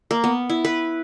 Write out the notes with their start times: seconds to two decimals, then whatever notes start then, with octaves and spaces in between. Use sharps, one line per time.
0.11 A#3
0.24 B3
0.50 E4
0.65 B4